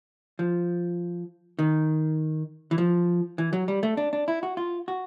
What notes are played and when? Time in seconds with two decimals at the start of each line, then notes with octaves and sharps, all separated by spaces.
0.39 F3
1.59 D#3
2.71 E3
2.78 F3
3.38 E3
3.53 F#3
3.68 G3
3.83 A3
3.97 D4
4.13 D4
4.28 E4
4.43 F#4
4.57 F4
4.88 F#4